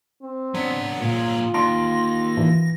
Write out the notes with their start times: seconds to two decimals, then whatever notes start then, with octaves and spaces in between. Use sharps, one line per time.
0.22 C4
0.55 F#3 B3 D4
1.01 A#2 F4 G#4
1.54 D#2 C6 A#6 D7
2.37 E3